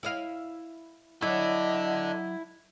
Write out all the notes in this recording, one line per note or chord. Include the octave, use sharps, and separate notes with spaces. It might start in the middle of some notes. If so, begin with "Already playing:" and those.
E4 D#5 F5
F#3 E4 A4 D5 D#5